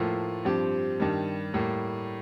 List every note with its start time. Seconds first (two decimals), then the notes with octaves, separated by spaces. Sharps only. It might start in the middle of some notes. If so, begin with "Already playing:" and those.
Already playing: A2 F3 A#3 F4 A4
0.45 G2 F3 C4 G4
1.00 G2 D#3 G3
1.54 A2 G3 A#3